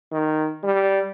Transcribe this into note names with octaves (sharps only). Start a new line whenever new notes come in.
D#3
G3